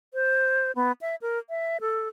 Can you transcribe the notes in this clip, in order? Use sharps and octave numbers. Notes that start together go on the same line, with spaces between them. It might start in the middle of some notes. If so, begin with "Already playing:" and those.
C5
B3
E5
A#4
E5
A4